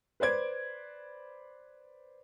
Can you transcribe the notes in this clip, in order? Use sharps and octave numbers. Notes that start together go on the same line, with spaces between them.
B4 C5 D5 G#6 D7